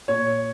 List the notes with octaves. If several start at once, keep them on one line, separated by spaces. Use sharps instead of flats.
A#2 C#5